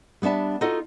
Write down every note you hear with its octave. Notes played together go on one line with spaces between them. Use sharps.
G3 B3 D4 E5 A5
D#4 F4 F#4 A4 D#5